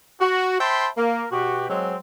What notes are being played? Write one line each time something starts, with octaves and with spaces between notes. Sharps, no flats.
F#4
C5 E5 G5 A5 B5 C6
A#3 A#4
B2 F#4 G4
F#3 G#3 C4